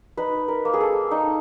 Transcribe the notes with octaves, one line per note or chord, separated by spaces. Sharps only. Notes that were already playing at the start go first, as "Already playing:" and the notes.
D#4 B4
A#4
A#3
G#4
A4
D#4